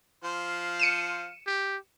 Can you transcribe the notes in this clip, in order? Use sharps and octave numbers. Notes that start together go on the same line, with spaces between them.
F3 C5 F5
C#7 D#7 E7
G4